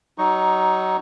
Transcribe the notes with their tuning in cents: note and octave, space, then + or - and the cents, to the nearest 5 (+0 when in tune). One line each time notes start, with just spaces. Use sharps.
F#3 +30 D#4 +5 C#6 +0